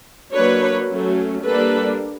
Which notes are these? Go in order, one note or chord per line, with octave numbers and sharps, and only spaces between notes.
F#3 A#3 D4 B4 C#5
F#3 A3 C#4
G3 A#3 D4 A4 B4